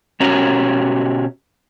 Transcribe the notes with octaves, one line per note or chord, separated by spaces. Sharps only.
B2 C#4 F#4 G4 C#5 A#5